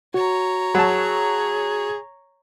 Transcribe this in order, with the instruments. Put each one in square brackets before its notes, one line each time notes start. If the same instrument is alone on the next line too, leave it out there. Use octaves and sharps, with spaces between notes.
[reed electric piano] F#4 [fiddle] C#5 A#5
[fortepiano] F#3 A5 [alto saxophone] G#4